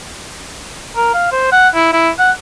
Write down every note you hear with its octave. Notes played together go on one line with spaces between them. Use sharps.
A#4
F5
C5
F#5
E4
E4
F#5